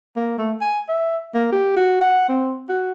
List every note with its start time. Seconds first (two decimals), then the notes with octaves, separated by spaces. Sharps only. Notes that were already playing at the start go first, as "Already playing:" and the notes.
0.16 A#3
0.38 A3
0.61 G#5
0.89 E5
1.35 A#3
1.53 G4
1.77 F#4
2.01 F#5
2.29 C4
2.69 F#4